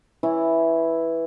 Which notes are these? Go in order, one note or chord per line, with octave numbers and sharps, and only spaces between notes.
E3 E4 C#5